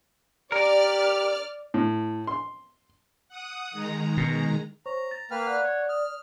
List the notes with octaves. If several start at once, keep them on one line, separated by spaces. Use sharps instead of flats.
G4 A#4 D5 F6
A2
C6
F#5 D#6
D#3 G#3 A#5
B2
C5 C#5 A#5 C#6
A6
A#3 B4 G5 F6
D5 F#5 F#6
C#5
D#6 F6